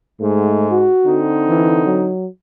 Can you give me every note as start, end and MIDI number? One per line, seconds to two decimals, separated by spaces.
0.20 0.85 44
0.20 0.70 57
0.71 1.21 66
1.05 2.11 50
1.05 2.11 60
1.05 2.11 63
1.49 1.82 52
1.86 2.27 54